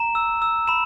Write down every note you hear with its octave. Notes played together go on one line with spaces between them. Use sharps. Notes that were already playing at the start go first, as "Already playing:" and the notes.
Already playing: A#5 E7
E6
E6
B5 E7